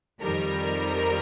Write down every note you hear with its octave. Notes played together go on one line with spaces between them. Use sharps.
F2 D#3 G3 A#4